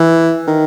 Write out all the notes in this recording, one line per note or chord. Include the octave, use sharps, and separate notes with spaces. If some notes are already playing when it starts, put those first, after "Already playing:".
Already playing: E3
D#3